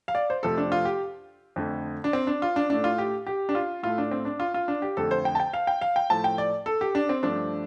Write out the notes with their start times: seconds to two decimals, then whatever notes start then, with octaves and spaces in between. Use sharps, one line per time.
0.08 F5
0.15 D5
0.30 C5
0.43 F2 C3 F3 A3 A4
0.58 D4
0.72 F4
0.85 G4
1.56 F2 D3 A3
2.04 D4
2.13 C4
2.27 D4
2.42 F4
2.56 D4
2.70 A2 A3 D4
2.84 F4
2.98 G4
3.27 G4
3.49 D4
3.55 F4
3.83 A2 A3 F4
3.98 D4
4.11 C4
4.25 D4
4.40 F4
4.54 F4
4.68 D4
4.82 G4
4.96 F2 D3 F3 A3 A4
5.11 C5
5.25 G5
5.35 A5
5.40 G5
5.53 F5
5.67 G5
5.81 F5
5.96 G5
6.10 A2 F3 A3 A5
6.24 G5
6.38 D5
6.66 A4
6.81 G4
6.95 D4
7.09 C4
7.23 G2 F3 A3 D4